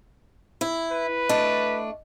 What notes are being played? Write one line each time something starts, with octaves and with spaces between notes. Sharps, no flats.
E4
B4
A3 D4 D#5